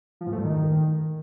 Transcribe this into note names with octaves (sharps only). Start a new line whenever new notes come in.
F3
G#2
A3
G2
D#3